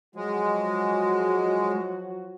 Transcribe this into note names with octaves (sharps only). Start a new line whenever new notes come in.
F3 F#3 G#3 F#4